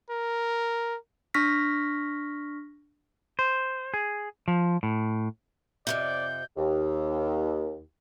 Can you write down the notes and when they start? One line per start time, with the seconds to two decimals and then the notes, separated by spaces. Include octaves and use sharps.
0.10 A#4
1.34 D4 C#6 F6 A#6 B6
3.39 C5
3.94 G#4
4.48 F3
4.83 A2
5.87 F2 A2 C3 D5 G6
6.57 D#2